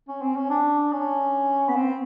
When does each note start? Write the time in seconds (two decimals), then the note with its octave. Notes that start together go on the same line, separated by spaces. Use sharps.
0.08 C#4
0.22 C4
0.36 C#4
0.50 D4
0.93 C#4
1.69 B3
1.76 C4